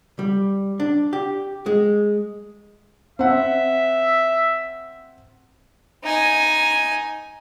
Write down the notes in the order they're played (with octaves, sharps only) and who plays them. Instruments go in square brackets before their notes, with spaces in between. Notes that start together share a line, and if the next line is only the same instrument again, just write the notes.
[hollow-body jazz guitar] G3
D4
G4
G#3
[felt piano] C4 F#5 [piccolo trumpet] E5
[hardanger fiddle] D#4 G#5